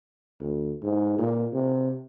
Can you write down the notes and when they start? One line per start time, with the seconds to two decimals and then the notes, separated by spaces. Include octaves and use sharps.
0.40 D2
0.83 G#2
1.18 A#2
1.53 C3